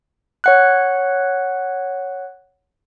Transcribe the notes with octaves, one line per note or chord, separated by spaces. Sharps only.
C#5 F#5 F#6